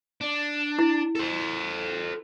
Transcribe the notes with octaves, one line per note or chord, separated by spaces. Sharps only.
D4
E4
A4 C5